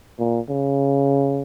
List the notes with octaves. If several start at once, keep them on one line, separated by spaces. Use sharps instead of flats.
A#2
C#3